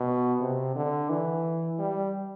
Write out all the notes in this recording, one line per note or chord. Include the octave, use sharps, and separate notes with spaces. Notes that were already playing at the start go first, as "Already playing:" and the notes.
Already playing: B2
C3
D3
E3
G3